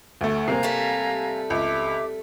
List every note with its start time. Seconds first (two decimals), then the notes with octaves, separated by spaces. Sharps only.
0.21 D2 A3
0.48 C3 A#3 C4 F5 G#5 A#5 C7
0.63 G3 A3
1.50 C#2 E5 D6